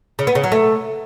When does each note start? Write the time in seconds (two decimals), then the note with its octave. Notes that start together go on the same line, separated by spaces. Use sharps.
0.19 C#3
0.27 B3
0.35 C#3
0.43 F#3
0.52 A3